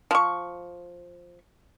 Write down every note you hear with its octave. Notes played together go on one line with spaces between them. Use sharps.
F3 C#6